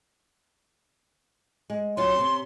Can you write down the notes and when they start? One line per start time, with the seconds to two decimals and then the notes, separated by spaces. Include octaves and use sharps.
1.70 G#3
1.97 F#3 C#4 F4 C6
2.16 C3 C#4